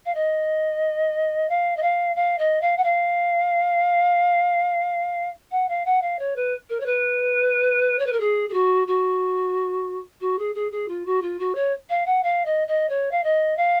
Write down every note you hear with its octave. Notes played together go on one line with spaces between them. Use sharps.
F5
D#5
F5
D#5
F5
F5
D#5
F5
F#5
F5
F#5
F5
F#5
F5
C#5
B4
A#4
C#5
B4
C#5
B4
A#4
G#4
G#4
F#4
F#4
F#4
G#4
G#4
G#4
F4
F#4
F4
F#4
C#5
F5
F#5
F5
D#5
D#5
C#5
F5
D#5
F5